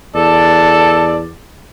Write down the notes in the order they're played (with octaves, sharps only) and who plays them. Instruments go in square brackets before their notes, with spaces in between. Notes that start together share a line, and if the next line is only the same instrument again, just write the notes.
[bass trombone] E2 [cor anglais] A4 [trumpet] D5